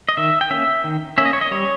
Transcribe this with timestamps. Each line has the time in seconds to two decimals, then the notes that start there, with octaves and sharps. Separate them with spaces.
0.09 D#5
0.17 D#3 E5
0.41 G5
0.51 A#3 C#4 E5
0.84 D#3
1.18 A#3 C#4 E5
1.25 D#5
1.33 C#5
1.41 D#5
1.51 G3 C#5